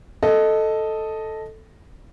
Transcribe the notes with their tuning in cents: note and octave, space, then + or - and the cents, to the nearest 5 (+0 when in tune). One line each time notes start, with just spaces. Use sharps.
A4 +0 D#5 +0